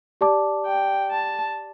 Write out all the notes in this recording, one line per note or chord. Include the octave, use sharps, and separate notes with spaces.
G4 D5 A5 D6
G5
A5